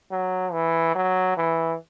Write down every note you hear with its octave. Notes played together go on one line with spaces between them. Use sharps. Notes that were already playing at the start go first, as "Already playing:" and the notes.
F#3
E3
F#3
E3